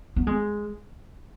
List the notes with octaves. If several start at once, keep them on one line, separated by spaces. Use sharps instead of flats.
B3
G#3